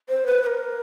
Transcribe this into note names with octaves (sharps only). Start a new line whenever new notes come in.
C5
B4
B4
A#4